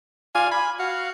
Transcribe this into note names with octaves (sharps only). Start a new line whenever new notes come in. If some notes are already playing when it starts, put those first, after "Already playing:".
F4 D5 F5 G#5
G#5 B5
F#4 F5